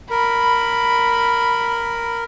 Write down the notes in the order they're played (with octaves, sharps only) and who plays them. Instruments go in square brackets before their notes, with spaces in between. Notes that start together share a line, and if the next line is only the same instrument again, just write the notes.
[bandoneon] A#4 [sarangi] B5